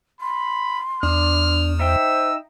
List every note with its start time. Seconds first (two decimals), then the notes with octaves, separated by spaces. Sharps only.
0.21 B5 C6
1.03 E2 D4 F6
1.80 D#4 C5 E5 G5 E6